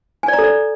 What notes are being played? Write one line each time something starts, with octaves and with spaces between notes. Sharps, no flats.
G#5
D5
A#5
A4
D5